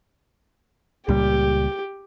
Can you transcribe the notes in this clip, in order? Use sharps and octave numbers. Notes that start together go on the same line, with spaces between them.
C#2 A#2 G3 G4